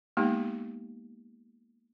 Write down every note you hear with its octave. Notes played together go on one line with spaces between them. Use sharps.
G#3 A#3 B3 D#4 G4